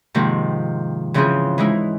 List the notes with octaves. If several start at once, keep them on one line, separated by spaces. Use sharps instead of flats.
G#2 C3 D#3 F3 A#3
C#3 E3 F3 C4 F4 G#4
E3 G#3 D#4 E4